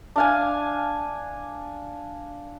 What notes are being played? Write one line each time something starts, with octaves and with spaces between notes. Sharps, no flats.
D4 F5 G#5